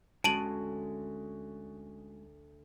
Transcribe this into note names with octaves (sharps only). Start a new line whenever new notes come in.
D2 G#3 C#4 F#4 A5 D7 D#7 F#7